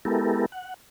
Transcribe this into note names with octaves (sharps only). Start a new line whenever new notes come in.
G#3 B3 E4 G4 A4 A#4
F#5